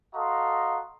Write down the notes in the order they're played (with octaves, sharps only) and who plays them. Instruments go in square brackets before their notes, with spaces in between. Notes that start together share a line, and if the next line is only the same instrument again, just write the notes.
[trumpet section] F#4 A4 D#5 F5 A#5 C6